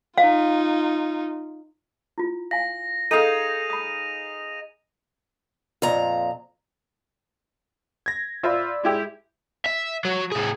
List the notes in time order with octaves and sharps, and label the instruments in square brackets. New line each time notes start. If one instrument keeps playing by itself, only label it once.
[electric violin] D#4 F4 [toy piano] F5
[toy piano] E4 F4
[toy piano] F5 G#5 [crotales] A#6
[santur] D#4 G#4 F5 [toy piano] A4 [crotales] D#7 F7
[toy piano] B5 D#6
[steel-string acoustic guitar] F2 A#2 A#5
[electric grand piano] G#6 A#6
[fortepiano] F4 C5 E5 [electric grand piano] D5 B5 E6
[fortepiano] G#3 E4 G4
[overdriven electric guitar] E5
F#3
A2 G#4